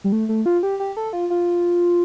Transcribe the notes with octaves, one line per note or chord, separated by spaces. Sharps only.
G3
A3
A3
F4
G4
G4
A4
F4
F4